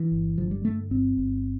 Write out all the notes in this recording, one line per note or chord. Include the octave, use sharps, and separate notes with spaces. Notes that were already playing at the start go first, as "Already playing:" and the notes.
Already playing: E3
G1
D3 F3
G3
G2 A3
G1 C4
G1